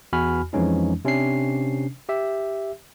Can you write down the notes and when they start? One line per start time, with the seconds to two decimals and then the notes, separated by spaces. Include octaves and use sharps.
0.13 E2 F#4 G#5 B5 F6
0.53 F2 E3 F3 G#3 C#4 D#4
1.05 C3 C#4 D4 C7
2.09 G4 E5